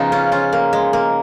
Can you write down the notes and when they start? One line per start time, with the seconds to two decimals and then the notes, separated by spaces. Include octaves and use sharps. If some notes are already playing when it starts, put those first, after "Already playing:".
Already playing: C#3 F3 B3 D#4
0.12 C#4 F4
0.32 C#4 F4
0.52 A#3
0.73 G#3
0.93 A#3